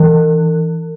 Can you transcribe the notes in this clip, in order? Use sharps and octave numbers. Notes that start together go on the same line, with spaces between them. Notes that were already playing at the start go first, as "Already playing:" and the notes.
Already playing: E3